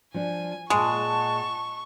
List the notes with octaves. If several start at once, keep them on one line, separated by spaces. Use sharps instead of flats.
F3 D4 G#5
A#2 G#3 G#4 F5 F#5 A5 C#6